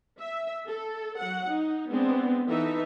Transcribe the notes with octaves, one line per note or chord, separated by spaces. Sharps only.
E5
A4
F#3 F#5
D#4
G#3 B3 C4 D4
E3 D#4 A4 E5